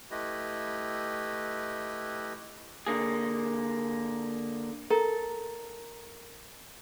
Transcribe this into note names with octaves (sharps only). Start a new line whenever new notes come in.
A3 E4 G4 B4 D#5
D3 A#3 G#4
A4 A#4 A#5